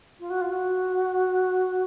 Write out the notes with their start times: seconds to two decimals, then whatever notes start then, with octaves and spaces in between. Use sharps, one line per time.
0.20 F4
0.30 F#4
0.41 F4
0.51 F#4